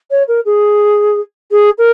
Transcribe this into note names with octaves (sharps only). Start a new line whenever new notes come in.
C#5
A#4
G#4
G#4
A#4